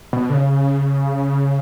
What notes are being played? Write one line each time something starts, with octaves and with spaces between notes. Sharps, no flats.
B2
D3
C#3